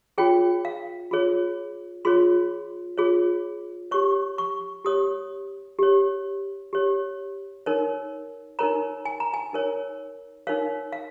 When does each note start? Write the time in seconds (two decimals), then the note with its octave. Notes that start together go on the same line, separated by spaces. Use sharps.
0.18 F4 G#4 C#5 G5
0.65 F5
1.11 F4 G#4 C#5
2.05 F4 G#4 C#5 C6
2.98 F4 G#4 C#5
3.91 G4 C#5 C#6
4.38 C#6
4.85 G4 C#5 D#6
5.79 G4 C#5
6.73 G4 C#5
7.66 D#4 A#4 C#5
8.59 D#4 A#4 C#5 A#5
9.05 G#5
9.20 A#5
9.34 G#5
9.53 D#4 A#4 C#5
10.47 D#4 A#4 C#5 F5
10.93 F5